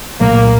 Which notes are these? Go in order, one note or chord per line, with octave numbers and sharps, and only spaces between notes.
C2 A#2 F#3 A3 A#3